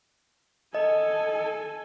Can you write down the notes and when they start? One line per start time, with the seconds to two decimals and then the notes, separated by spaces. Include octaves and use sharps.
0.75 A4 D#5 G#5